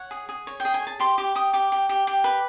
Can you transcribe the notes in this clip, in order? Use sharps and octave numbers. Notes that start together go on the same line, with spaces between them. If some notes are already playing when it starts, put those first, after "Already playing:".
Already playing: C#5 F#5
G#4
G#4
C#5
G5
G#4
G#5
C#5 A5
G4 C6
G4 D6
G4 D#6
G4 D6
G4
G4
G4
B4